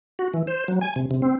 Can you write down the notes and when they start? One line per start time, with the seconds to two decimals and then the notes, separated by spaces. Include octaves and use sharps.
0.19 F#4
0.34 E3
0.47 C5
0.68 F#3
0.81 G#5
0.96 C3
1.11 C3
1.22 C4